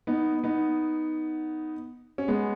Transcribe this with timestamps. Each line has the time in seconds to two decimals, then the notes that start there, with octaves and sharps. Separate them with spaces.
0.07 B3 D#4
0.44 B3 D#4
2.18 C#4
2.28 G#3 B3